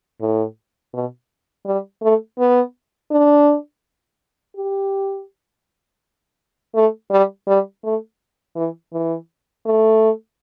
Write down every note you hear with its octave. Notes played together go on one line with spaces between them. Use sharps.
A2
B2
G3
A3
B3
D4
G4
A3
G3
G3
A3
E3
E3
A3